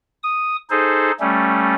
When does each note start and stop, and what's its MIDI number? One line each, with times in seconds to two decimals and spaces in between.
0.23 0.56 87
0.70 1.11 63
0.70 1.11 68
0.70 1.11 69
0.70 1.11 72
1.20 1.75 55
1.20 1.75 57
1.20 1.75 61